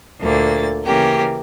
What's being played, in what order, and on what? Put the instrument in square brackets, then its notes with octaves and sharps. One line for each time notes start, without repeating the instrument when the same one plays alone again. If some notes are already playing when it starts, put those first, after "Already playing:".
[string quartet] D2 A#2 D3 A#3 A6
C#3 E3 A#3 C#4 G4 A#4